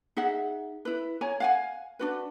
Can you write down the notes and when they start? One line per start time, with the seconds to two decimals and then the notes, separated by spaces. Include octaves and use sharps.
0.17 D#4 G#4 E5 F#5
0.85 E4 B4
1.21 C#5 G#5 A#5
1.40 F5 F#5 G#5
1.99 D4 F#4 B4